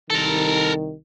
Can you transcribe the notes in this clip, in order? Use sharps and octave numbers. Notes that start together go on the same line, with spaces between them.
C2 D#3 A4 A#4